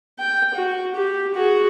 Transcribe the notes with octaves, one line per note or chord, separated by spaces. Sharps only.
G5
F#4
G4
F#4 G#4